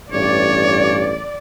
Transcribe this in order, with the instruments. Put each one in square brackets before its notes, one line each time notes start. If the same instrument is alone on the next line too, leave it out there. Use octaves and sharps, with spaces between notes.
[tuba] A1 [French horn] G2 [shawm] C#5 [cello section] D5